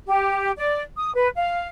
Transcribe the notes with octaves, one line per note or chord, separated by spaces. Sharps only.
G4
D5
D#6
B4
F5